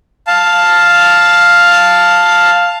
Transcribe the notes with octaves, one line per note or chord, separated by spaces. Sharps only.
F5 A5